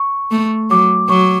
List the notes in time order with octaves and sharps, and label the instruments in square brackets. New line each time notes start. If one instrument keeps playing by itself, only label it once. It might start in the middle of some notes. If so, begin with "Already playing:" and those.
Already playing: [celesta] C#6
[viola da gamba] A3
[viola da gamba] F#3 [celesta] D6
[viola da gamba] F#3 [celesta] C#6